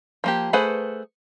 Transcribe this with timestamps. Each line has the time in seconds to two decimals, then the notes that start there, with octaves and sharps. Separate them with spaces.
0.24 F3 A#3 G4
0.53 A3 G#4 B4 C5 F#5